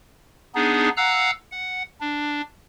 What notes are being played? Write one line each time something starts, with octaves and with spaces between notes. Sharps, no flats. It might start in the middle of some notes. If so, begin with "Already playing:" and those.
B3 D4 D#4 G#4
F5 F#5 A#5 E6 F#6
F#5
D4